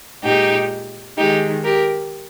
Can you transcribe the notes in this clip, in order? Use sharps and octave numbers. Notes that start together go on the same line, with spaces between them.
A#2 G#3 D#4 G4
D#3 G#3 D#4 G4
G4 A#4